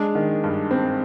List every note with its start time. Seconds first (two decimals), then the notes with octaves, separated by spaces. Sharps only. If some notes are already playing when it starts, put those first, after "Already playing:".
Already playing: G#3 D4
0.15 D#3
0.44 G2
0.71 C4